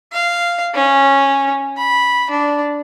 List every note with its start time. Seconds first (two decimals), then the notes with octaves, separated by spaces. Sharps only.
0.13 F5
0.75 C#4
1.77 B5
2.30 D4